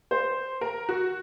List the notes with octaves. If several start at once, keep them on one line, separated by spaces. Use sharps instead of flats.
C5
A#4
F#4